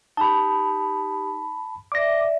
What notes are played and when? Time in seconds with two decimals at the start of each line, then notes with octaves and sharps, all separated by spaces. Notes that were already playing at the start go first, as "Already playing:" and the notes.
0.17 D#4 G4 A5 B5
1.92 D5 E5 D6 A#6